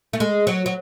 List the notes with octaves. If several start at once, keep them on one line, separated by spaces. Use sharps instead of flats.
A3
G#3
F#3
F#3